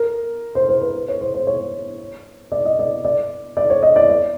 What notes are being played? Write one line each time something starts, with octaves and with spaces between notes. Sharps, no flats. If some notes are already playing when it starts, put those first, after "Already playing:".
Already playing: A#4
C5
C5
B4
C#5
C5
C5
C#5
D5
D#5
D5
D5
D5
C#5
D#5
D5
D5